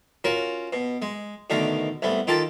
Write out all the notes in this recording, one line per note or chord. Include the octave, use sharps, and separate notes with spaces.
C#4 F4 F#4 A#4
B2
G#3
B2 D3 D#3 A3 A#4
C2 A3 B3
D#3 F4 G4 A4 A#4 A5